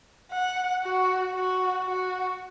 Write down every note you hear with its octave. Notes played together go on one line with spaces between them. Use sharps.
F#5
F#4
F#4
F#4